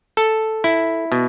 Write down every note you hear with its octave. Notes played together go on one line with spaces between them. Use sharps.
A4
E4
B2